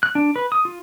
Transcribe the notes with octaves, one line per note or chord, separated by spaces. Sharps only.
F#6
D4
B4
D#6
F4